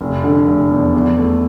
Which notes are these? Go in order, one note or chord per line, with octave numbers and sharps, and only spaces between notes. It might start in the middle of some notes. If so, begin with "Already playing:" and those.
F1
D3
F1
E2
E2
A3